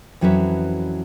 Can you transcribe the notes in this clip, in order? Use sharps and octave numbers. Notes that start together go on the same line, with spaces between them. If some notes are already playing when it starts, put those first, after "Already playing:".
F2 E3 F#3 C#4 B4 E5